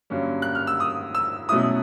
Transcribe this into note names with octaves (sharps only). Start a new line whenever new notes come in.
G2 D3 F#3 A#3 C#4
F#6
F6
E6
D#6
E6
B2 F#3 A3 C#4 E4 D#6